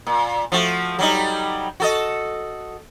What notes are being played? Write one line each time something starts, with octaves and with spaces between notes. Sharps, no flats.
A#2
F3 A3 F#4
F#3 G3 D#4
F#4 A4 D#5